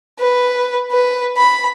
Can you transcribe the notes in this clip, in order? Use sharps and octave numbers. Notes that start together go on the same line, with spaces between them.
B4
B4
B5